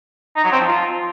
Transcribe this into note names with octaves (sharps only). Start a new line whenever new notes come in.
D#4
F#3
C4
F3
F4